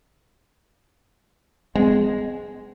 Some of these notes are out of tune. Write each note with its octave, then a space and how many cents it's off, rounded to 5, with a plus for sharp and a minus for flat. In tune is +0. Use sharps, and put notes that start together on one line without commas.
G#3 +0 C4 -45